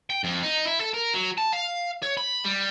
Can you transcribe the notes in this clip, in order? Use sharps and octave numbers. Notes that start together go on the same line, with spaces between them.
G5
F2
D#4
E4
A4
A#4
F#3
A5
F5
C#5
B5
G3